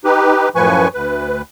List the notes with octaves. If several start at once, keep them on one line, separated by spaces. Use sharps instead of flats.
D#4 G4 B4
F#2 A2 F3 B4 G#5 C#6
D2 B4